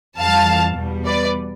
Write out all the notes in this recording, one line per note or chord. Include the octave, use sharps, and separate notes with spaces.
F2 E3 G3 F5 A5
E2 B2 G3
B4 D5